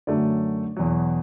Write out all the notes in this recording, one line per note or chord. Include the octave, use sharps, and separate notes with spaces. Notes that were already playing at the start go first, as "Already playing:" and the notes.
F#2 D3 F#3 A3 D5
E2 B2 F#3